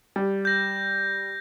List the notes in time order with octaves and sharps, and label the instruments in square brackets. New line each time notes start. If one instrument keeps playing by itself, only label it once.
[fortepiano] G3
[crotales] G6 A#6